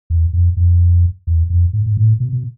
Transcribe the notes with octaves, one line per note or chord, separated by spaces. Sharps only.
E2
F2
F2
E2
F2
G#2
G#2
A2
B2
B2